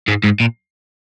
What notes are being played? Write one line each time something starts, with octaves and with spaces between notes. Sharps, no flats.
G#2
G#2
A#2